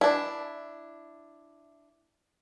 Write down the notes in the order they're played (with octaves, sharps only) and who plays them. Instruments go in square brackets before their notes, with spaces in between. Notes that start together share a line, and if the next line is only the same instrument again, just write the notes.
[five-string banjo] D4 E4